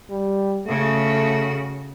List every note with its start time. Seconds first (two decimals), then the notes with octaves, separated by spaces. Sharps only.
0.10 G3
0.67 C#3 A3 F#4